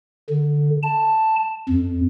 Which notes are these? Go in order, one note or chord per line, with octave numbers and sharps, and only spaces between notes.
D3
A5
F2